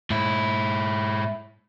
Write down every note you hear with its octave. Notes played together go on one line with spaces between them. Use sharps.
G#2 E4